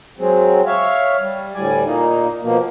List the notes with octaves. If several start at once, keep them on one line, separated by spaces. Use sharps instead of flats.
F#3 G#3 C4
C#5 E5 F5
G3
D2 A2 G3 D5 G#5
A#2 A#3 D#4
B2 F3 A#3